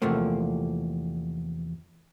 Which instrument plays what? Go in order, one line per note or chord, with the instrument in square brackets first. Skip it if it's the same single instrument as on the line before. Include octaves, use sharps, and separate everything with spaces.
[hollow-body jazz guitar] E2 C3 F3 A3 A#3